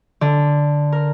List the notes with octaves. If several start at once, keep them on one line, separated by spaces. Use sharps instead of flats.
D3
A#4